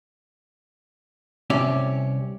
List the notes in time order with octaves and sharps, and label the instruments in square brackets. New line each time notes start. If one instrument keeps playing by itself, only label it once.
[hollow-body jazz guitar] C2 C3 C#4 D5